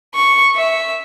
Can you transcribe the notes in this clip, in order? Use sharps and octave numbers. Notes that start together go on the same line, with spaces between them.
C#6
E5